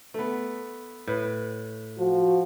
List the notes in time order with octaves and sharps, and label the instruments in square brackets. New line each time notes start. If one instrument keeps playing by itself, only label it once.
[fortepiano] A3 B3
[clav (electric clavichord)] A2 [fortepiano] B4
[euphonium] F3 [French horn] F#4